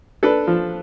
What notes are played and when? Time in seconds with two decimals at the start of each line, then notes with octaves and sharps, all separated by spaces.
0.23 D4 A4 B4
0.47 F3